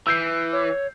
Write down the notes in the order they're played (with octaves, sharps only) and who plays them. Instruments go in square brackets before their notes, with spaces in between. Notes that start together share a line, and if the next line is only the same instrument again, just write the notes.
[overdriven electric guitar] E3 [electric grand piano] E6 G6 C7
[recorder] C#5